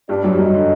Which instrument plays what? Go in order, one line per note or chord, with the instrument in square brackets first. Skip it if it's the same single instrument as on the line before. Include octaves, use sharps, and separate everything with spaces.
[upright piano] G2 G3 [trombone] D4
[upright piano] F#2 F#3
G3
[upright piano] F#2 F#3 [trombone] D#4
[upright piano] D3